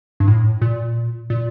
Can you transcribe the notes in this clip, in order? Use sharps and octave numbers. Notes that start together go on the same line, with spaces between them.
G2
A2
A#2
A#2